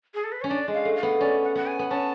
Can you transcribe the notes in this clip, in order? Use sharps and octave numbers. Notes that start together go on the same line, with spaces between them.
G#4
A4
B4
C#4 C#5
D4 D5
G#3
F5
A3
F5
B3
C#4 D5
F#5
B3 F#5
G#5
B3
C#4 A5